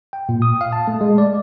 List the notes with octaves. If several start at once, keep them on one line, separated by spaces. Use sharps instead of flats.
G5
A#2
D#6
F5
A5
A3
G#3
D5